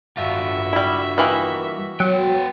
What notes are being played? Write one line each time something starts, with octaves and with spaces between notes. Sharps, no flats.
G2 F4 F#4 E5
G3 E4
D#3 E3 A#3
F#3 B3 G5